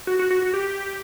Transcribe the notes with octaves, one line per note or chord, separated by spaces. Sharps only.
F#4
F#4
F#4
F#4
G4